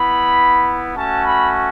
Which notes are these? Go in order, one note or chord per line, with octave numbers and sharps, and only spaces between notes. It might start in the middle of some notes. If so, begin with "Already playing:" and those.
Already playing: B3 E4 B5
A3 C#4 F#4 A5
B5